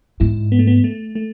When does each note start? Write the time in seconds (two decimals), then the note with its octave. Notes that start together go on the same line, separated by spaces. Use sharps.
0.20 G#2 E4
0.52 B3
0.59 A3
0.67 B3
0.84 A3
1.15 A3